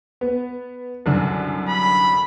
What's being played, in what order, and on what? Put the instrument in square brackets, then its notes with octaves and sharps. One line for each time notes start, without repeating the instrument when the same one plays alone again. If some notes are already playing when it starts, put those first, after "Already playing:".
[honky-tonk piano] B3
C2 F#2 D3
[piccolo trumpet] B5